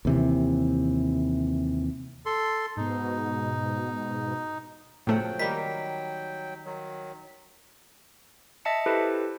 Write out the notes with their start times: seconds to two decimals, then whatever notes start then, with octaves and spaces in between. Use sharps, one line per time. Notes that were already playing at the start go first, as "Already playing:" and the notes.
0.05 D#2 C3 E3
2.26 A4 C6
2.77 G#2 B2 D#4
5.07 A2 C#3 F3 F#3 A3 F#5 G5
5.39 D#3 G3 A#3 B6
6.65 D#3 F#3
8.65 D#5 E5 A5 C#7
8.86 E4 G4 A4 B4 C5